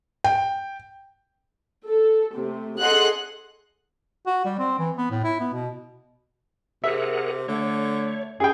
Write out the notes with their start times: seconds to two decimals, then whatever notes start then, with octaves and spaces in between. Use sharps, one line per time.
0.24 G5
1.87 A4
2.34 C3 A3
2.79 G#4 A4 D#5 F#5 C6 F#6
4.27 F#4
4.45 G3
4.59 C4
4.79 E3
4.97 B3
5.11 A2
5.24 E4
5.40 B3
5.53 B2
6.84 C3 G#4 A#4 E5 F#5
7.48 D3 A3 C#5
8.40 F#2 G4 G#4 G5